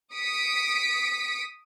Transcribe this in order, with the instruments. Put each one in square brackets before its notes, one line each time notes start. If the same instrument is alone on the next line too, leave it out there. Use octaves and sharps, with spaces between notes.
[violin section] D#6 B6 C#7 D7